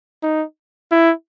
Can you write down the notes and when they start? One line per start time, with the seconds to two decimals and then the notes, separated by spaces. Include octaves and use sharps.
0.23 D#4
0.91 E4